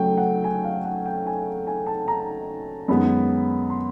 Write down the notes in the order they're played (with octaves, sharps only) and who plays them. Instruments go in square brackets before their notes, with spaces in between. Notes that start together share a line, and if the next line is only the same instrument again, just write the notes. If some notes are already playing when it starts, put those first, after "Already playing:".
Already playing: [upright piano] C#3 F#3 A3 G5
F#5
G#5
F5
F#5
G5
G#5
G#5
A5
A#5
F#2 D#3 G#3 B3 B5
C6